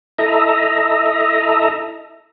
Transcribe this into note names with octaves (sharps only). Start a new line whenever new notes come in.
E4 A4 D#5 E5 A#5